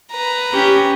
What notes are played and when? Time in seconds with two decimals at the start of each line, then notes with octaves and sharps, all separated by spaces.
0.11 B4 A#5
0.52 C#4 G4